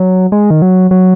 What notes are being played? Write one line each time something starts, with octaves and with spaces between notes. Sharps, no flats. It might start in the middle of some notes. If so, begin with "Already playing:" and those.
Already playing: F#3
G#3
D#3
F#3
F#3